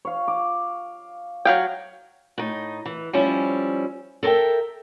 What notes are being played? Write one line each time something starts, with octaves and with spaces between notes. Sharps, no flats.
C#5 F5
D6
F#3 F5 G5
A2 D#4
E3
F3 G3 C#4 E4
A4 A#4 C#5 E5 G5